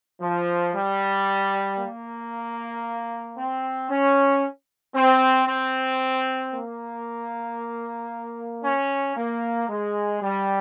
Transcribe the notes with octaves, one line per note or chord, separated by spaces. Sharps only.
F3
G3
A#3
C4
C#4
C4
C4
A#3
C#4
A#3
G#3
G3